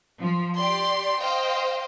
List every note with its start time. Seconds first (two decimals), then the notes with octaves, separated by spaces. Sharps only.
0.20 F3
0.56 G4 D5 C6
1.20 C5 D#5 F5 G5